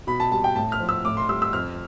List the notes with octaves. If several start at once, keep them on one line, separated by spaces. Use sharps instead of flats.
B2 B5
A5
G3 A5
G5
A2 A5
F6
F3
E6
A2 D6
C6
G3 E6
E6
F2 F6